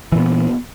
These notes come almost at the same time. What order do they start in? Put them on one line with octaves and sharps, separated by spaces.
E3 A#2 B3